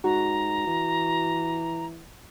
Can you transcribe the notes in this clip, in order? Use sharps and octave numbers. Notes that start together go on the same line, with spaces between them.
G#2 F#4 A#5
E3